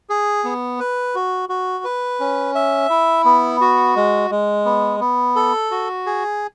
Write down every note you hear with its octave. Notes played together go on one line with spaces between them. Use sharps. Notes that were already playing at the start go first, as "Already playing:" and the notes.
G#4
B3
B4
F#4
F#4
B4
C#4
E5
E4
B3
F#4
G#3
G#3
B3
B3
A4
F#4
G#4